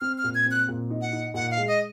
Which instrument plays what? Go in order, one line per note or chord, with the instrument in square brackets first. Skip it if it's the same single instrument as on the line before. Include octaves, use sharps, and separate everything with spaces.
[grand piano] C4 [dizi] F6
[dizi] F6
[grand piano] A#2
[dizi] G#6
[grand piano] C4
[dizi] F#6
[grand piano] A#2
D#4
[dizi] F#5
[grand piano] D#4
[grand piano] A#2 [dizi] F#5
[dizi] F5
[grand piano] G#3
[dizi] D#5